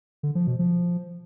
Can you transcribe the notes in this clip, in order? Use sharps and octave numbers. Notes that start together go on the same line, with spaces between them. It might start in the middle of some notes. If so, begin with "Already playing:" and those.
D3
F3
B2
F3